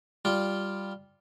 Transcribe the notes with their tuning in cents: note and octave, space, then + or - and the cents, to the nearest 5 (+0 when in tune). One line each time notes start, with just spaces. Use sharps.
G3 +0 F4 +0